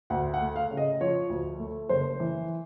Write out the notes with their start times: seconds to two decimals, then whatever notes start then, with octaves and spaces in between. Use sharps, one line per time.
0.10 D2 F#5
0.34 F#5
0.41 A3
0.56 F5
0.71 C#3
0.77 D#5
1.01 F3 C#5
1.29 D2
1.59 A3
1.89 F#1 C5
2.20 E3